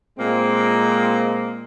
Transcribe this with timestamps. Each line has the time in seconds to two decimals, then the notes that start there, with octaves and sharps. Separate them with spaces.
0.19 A#2 G#3 A#3 C4